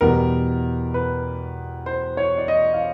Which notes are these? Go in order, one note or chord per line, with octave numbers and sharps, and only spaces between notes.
E2 B2 G3 B3 A#4
B4
C5
C#5
D5
D#5
F5